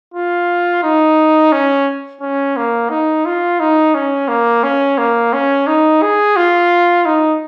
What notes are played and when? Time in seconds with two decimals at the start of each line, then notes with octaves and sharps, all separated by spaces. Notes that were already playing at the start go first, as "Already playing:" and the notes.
0.14 F4
0.83 D#4
1.52 C#4
2.21 C#4
2.56 A#3
2.90 D#4
3.25 F4
3.60 D#4
3.94 C#4
4.28 A#3
4.63 C#4
4.98 A#3
5.33 C#4
5.67 D#4
6.02 G#4
6.36 F4
7.05 D#4